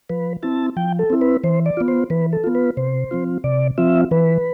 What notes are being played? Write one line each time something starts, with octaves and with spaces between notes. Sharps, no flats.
F3 B4
C4 E4 A5
F3 G5
A4
C4 E4
B4
E3 C5
D5
B3 F4
C5
E3 B4
A4
B3 F4
B4
C3 C5
F3 C4 F4
C3 D5
F3 C4 F4 E5
E3 B4